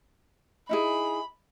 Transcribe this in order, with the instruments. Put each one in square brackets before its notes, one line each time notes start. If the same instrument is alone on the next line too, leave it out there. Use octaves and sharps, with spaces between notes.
[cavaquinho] D#4 E4 G#4 [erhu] B5